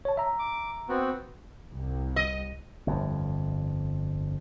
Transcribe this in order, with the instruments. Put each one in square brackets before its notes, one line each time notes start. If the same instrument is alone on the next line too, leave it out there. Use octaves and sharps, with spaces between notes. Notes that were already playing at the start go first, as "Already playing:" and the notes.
[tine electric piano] C#5 A5
E5 A#5
[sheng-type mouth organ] D6
B3 C4 F#4
[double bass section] C2
[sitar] D#5
[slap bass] G1 F2